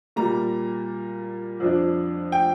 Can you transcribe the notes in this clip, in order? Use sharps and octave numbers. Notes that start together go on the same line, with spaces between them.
A#2 G3 A#3 A#5
F2 F3 D4
G5